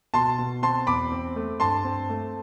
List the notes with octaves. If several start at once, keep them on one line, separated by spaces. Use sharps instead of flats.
B2 A5 C6
B2
C4 A5 C6
E2 B5 D6
C4
A3
G2 A5 C6
C4
A3